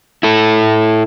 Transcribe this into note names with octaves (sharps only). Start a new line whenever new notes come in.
E4 A4